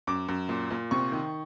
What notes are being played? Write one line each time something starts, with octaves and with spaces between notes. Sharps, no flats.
F#2 D6
F#2
A#2
A#2
C3 C#6
D#3